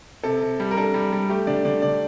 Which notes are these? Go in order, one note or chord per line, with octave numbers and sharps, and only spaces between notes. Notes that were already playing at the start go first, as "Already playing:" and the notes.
C3 A4
C3
G3
A#4
D4 A4
G3
G3
A3 G4
D3 D5
D3 D5
D3 D5